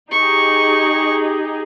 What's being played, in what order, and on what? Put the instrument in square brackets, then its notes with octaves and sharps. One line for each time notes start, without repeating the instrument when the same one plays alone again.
[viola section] D#4 G4 G#4 [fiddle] C#6